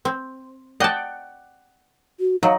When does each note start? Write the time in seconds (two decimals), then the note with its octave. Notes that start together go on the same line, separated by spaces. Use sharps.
0.05 C4
0.80 D5 D#5 F#5 G5 A5
2.20 F#4
2.43 F#3 D#4 F5